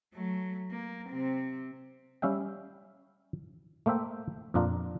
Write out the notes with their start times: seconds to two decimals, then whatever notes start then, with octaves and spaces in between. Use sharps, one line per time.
0.14 F#3 A3
0.71 A#3
1.09 C3 C4
2.22 G3 C#4 E5 F5 G5
3.86 A3 A#3 C5 E5 G5
4.54 F2 A#2 D4 F4 A#4